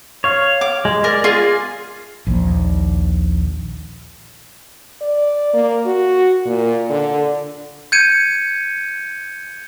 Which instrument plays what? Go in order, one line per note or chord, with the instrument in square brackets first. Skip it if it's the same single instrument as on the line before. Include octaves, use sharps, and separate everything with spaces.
[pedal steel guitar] C#5 F5
[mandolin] D6
[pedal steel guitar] G#3
[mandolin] A#4 [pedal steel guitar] D5
[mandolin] F4 G#4
[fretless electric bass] A#1 D#2
[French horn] D5
A#3
F#4
A#2
D3
[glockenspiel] G6 G#6 C#7 D#7